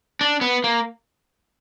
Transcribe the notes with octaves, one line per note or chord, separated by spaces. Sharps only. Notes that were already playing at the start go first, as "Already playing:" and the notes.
D4
B3
A#3